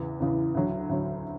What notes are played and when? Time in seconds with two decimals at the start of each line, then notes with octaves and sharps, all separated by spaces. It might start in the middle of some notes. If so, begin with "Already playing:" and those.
Already playing: E2 C#3 E3
0.20 E2 C#3 E3
0.54 D2 D3 F#3
0.89 D2 D3 F#3